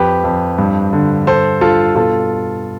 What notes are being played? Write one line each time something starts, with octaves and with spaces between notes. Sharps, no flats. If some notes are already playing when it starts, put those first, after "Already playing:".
Already playing: F2 G4 B4
F2
G2
D3
G2 A4 C5
G2 F4 A4
B2 F4 A4